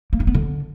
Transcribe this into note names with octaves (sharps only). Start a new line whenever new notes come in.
A#3
D#4
B3
D3